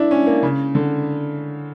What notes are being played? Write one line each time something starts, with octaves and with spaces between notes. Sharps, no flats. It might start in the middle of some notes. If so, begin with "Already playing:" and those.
Already playing: D4 E4
C#4
A#3
C#3
D3